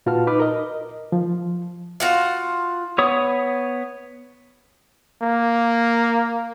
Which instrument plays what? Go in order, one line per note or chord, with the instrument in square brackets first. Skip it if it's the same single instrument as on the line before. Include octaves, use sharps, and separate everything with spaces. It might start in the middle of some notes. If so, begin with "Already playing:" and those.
[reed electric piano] A#2 F4 F#4 B4 A5 F6
D#4 B4 D6 F6
A#4 D#5
F3
[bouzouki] F4 F#4 F5
[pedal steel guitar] B3 C#5 D#6
[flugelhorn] A#3